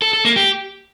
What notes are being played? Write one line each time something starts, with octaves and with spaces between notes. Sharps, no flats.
A4
A4
A#3
G4